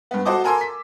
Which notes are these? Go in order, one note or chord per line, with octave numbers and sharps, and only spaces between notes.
G2 B3
F#4 A4 C5 D#5 D6
A4 A#4 G#5 C6 E6
B6